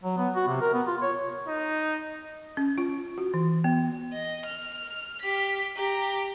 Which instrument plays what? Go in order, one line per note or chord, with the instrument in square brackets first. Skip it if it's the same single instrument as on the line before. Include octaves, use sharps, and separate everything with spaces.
[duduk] F#3
B3
F#4
C3
A#4
B3
F4
C#5
[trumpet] D#4
[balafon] C#4
F4
F#4
E3
B3
[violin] D#5
F6
G4 B6
G4 A#5